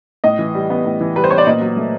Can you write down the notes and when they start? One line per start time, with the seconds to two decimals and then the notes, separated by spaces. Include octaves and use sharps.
0.24 A2 D#5
0.39 E3
0.55 G3
0.70 B3
0.86 A2
1.01 E3
1.16 G3 B4
1.24 C5
1.30 B3 C#5
1.38 D5
1.47 A#2 D#5
1.61 F#3
1.77 A3